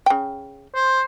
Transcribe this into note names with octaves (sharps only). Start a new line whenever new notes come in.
C#3 G5
C5